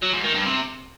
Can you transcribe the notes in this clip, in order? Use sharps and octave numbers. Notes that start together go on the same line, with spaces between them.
F#3
G#2
D#3
G2
C3